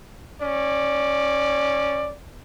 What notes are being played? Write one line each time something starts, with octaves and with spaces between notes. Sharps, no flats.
C#4 D5